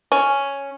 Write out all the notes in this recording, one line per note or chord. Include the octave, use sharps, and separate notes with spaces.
C#4